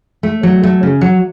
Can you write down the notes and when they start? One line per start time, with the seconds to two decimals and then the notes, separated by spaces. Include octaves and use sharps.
0.23 A3
0.43 F#3
0.63 A3
0.83 C#3
1.01 F#3